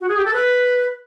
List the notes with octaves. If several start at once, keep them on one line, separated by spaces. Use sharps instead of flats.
F#4
G#4
G4
A4
B4